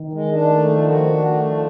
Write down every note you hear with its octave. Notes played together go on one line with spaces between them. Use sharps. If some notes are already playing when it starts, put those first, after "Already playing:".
Already playing: D#3
G#3
D4
A3
F3
F#4
D4
A3
F3